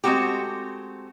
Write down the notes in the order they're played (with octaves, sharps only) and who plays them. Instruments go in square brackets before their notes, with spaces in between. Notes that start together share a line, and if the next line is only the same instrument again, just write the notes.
[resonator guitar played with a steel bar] G#3 A3 C4 F#4 G4